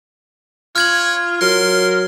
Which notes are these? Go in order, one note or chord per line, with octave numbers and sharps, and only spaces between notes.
F4 C#5 F6 G#6 F#7
F#3 A#4 C6